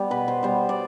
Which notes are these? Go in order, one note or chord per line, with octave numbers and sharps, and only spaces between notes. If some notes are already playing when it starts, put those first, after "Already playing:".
Already playing: G3 B3
B2 B4
C5
G3 B3 C5
D5